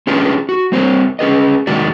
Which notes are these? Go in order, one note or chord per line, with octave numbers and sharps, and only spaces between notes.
C#4 D4 F4 G4 G#4 B4
F#4
G3 C4 C5 C#5
C#4 G#4 B4 D#5
C3 D#3 G#3 F#4 D5